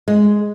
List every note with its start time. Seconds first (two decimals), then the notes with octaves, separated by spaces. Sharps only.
0.08 G#3